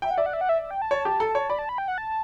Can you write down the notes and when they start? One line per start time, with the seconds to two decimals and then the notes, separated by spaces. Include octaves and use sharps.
0.02 E5 G5
0.11 F#5
0.17 D5 E5
0.26 F#5
0.33 E5
0.41 F#5
0.49 E5
0.62 E5
0.71 G5
0.82 A5
0.91 C#5
1.05 G4
1.20 A4
1.35 C#5
1.50 D5 B5
1.59 A5
1.69 B5
1.78 G5
1.88 F#5
1.98 A5